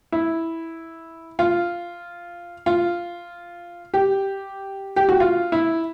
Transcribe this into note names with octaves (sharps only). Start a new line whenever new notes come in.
E4
F4
F4
G4
G4
F#4
F4
E4